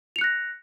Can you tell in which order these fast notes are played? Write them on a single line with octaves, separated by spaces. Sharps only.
F7 C#7 F#6 A#6